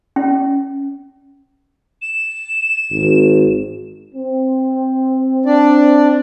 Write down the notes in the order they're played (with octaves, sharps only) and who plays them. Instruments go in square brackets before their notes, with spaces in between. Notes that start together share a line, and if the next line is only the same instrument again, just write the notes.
[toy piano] C#4
[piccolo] E7
[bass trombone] G#1
[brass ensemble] C4
[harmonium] D4 D5